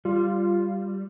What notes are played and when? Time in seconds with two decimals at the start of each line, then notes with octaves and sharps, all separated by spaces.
0.05 G3 F4